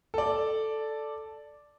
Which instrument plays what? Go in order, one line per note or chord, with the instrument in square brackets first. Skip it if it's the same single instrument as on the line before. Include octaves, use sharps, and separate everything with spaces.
[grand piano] A4 D5